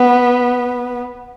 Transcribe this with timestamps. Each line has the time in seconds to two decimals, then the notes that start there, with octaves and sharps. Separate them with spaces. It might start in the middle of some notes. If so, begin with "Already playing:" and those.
Already playing: B3